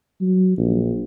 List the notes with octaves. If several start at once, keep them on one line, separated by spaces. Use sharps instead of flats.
F#3
A#1